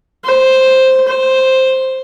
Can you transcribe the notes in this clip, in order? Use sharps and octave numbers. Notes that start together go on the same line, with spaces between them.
C5
C5